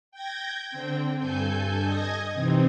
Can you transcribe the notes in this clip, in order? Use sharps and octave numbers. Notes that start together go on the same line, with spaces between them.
G5 G6 G#6 A#6
D3 C4 G5
G2 A4 G#5 G6
D#5 D#6 G#6 A#6
C3 E3 C4 D#4